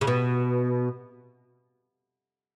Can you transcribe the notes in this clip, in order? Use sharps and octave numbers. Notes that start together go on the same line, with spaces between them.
C#3
B2